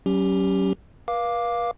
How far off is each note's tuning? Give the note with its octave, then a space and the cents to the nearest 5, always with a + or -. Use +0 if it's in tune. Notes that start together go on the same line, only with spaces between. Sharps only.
F#3 +30 C#4 +0 G4 +5
B4 -45 F5 +0 D6 +0